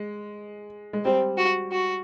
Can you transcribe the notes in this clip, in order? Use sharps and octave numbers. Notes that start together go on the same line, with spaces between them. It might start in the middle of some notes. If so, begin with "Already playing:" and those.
Already playing: G#3
G#3
G3 C4
F#4
F#4